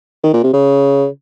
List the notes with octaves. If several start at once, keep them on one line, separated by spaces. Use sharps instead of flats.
D#3
A#2
C3
C#3